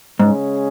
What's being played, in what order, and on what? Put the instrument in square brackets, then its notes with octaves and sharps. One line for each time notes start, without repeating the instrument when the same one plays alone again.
[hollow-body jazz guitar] G#2 [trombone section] C#3 G#3 C#4 G#4